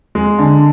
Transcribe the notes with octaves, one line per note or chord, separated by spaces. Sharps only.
G#3
D3